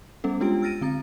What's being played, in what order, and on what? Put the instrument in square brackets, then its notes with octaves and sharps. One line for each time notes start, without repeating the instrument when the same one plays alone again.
[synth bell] G3 B3 C#4 A4
G#3 D4 F4 G4 G5 D7
E6 F6 A6 A#6 D7 D#7
D3 C4 A#5 A6